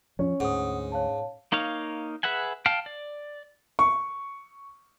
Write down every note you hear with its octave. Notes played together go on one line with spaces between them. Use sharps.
F3 C#4
D2 G#2 F#5 D#6
C#5 F5 A5
A#3 D#4 C#5 F5
G#4 B4 E5 F#5 G#5
F5 G5 A5 F6
D5
C#6